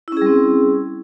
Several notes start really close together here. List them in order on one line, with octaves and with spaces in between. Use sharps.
E4 C#4 G#4 G3 C4